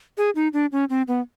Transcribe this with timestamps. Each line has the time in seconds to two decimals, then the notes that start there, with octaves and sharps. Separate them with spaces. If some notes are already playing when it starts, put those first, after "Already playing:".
0.17 G#4
0.35 D#4
0.53 D4
0.72 C#4
0.90 C4
1.08 B3